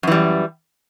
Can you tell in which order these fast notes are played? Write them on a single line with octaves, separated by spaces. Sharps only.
F#2 E3 G3